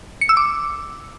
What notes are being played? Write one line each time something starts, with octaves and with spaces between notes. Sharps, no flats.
C#7
E6
D6